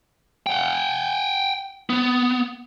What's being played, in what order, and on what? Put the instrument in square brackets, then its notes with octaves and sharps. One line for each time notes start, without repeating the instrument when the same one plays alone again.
[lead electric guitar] F#5 G5
B3